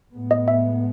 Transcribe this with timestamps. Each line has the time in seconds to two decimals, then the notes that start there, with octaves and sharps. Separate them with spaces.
0.15 A2 G#3 B3
0.31 D#5
0.48 E5